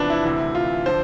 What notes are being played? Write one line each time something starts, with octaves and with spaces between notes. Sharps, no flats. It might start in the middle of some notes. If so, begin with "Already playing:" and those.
Already playing: E2 C3 F3 D4 B4
E4
D2 C3 E3
F4
D3 F3 C5